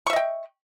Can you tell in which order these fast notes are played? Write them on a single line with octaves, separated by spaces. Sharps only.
C#6 E5 D#5 G5